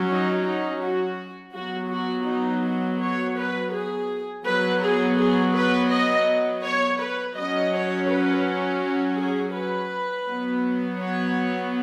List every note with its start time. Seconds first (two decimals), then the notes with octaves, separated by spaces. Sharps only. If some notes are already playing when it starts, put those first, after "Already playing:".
Already playing: F#3 C#4
0.09 D#4
0.46 D#4
0.82 F#4
1.54 F#3 B3 F#4
1.91 F#4
2.27 D#4
2.64 F#4
3.00 C#5
3.37 B4
3.73 G#4
4.45 F#3 B3 B4
4.82 G#4
5.18 G#4
5.54 B4
5.91 D#5
6.64 C#5
7.00 B4
7.36 F#3 C#4 D#5
7.73 C#5
8.08 B4
9.18 G#4
9.54 B4
10.27 F#3 B3
11.00 C#5